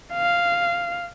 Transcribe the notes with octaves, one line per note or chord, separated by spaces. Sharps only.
F5